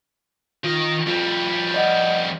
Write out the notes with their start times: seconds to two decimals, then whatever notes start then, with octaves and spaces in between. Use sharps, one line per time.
0.64 D#3 F4 D#5
1.07 F2 G3 F4
1.74 D5 D#5 F#5